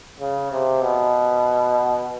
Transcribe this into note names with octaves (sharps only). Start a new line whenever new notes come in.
C#3
C3
B2